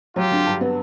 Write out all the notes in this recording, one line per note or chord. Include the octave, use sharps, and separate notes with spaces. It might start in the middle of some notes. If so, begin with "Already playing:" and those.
F#3 F4 G4
D3
G2
B3